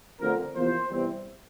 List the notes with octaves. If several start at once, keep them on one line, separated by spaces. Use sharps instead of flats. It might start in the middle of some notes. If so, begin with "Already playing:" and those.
D2 D3 F3 C4 A#4
E2 C3 F3 A#3 C5
E2 C3 E3 G3 C4